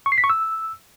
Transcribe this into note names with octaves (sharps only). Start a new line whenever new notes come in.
C#6
C7
B6
C#6
E6